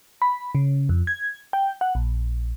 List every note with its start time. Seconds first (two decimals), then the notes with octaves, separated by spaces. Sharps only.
0.22 B5
0.55 C#3
0.89 F2
1.07 G#6
1.53 G5
1.81 F#5
1.95 A#1